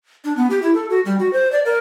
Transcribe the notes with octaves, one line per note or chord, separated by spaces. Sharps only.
D4
B3
G4
E4
A4
F#4
G3
F#4
C5
D5
A#4